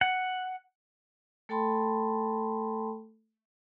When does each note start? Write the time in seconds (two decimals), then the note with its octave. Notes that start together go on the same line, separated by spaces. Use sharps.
0.01 F#5
1.49 A3 A4 G5 A5 B5 C6